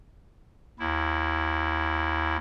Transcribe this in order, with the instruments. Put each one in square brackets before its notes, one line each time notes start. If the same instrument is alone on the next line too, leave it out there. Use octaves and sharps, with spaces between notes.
[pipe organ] D#2 E4